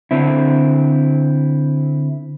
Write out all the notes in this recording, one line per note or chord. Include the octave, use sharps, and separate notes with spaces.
D3 C4 E4